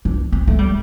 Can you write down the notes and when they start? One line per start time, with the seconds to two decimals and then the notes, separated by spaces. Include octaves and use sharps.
0.05 D4
0.32 C4
0.47 A3
0.59 G3